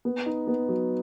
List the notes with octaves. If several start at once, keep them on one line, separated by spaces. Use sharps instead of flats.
B3
D#4
B3
F#3